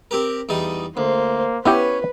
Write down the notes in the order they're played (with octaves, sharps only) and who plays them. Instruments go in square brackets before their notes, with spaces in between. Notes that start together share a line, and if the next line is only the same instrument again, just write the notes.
[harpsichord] C4 G4 A#4
E2 G3 D#4
[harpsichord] D2 [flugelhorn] A#3 [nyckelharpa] C5
[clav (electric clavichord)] B3 E4 G4 [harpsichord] C#4 [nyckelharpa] B4 [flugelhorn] C#5